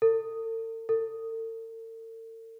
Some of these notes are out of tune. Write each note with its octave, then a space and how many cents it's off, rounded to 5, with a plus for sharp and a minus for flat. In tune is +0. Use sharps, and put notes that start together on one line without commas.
A4 +45
A4 +45